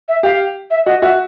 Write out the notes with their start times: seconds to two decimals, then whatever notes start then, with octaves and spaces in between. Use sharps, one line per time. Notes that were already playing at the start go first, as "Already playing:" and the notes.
0.08 E5
0.23 G4 F5
0.71 E5
0.86 F#4 D#5
1.01 F#4 E5